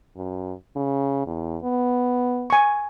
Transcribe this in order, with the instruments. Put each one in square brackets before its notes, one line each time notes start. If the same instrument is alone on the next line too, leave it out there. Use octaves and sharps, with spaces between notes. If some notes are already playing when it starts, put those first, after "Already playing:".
[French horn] F#2
C#3
E2
B3
[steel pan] G#5 C#6